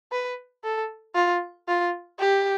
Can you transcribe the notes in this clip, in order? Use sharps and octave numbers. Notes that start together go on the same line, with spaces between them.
B4
A4
F4
F4
G4